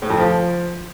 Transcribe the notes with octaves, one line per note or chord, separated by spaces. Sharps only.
A2
F2
F3